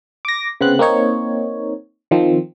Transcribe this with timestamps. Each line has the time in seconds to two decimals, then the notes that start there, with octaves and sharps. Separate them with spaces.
0.25 D6 A#6
0.61 C#3 B3 C4 F#6
0.79 A#3 C4 D#4 C#5
2.11 D#3 F3 C4